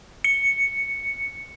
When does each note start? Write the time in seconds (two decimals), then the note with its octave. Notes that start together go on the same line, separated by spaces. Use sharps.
0.24 C#7